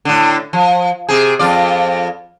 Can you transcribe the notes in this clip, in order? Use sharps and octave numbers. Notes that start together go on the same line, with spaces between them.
A2 D3
F3
C3 G#4
F2 F4 D5